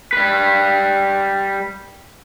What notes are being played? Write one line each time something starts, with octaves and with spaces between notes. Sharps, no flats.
G3 B4